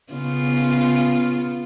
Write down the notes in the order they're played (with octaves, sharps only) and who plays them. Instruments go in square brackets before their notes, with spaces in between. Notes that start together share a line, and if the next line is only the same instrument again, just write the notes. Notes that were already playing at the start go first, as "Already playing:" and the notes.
[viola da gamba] C#3 B3 F4